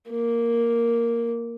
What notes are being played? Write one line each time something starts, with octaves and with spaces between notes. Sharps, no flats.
A#3